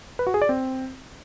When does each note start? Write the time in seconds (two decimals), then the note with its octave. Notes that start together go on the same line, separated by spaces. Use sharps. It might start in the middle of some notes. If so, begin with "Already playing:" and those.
0.19 B4
0.27 F#4
0.34 G#4
0.42 D5
0.49 C4